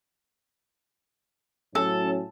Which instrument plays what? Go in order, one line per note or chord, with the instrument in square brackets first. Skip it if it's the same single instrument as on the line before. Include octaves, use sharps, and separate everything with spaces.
[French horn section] A2 F#3 C#4 [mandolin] A4